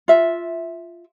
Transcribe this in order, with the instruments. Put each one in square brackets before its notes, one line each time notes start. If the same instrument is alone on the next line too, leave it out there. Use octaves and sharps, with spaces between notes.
[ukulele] F4 E5